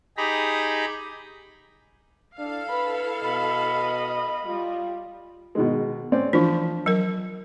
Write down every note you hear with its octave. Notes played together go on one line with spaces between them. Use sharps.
D#4 G4 G#4 A#5 B5
D4 E4 A4 F5
B4 B5
B2 D#5 B5
G3 F4
B2 D#3 G#3
C4 C#4 D5
E3 F3 D4
F#3 A#4